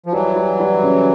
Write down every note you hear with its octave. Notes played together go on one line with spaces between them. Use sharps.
F3
E3 F#3 G3
G3
G3
C#3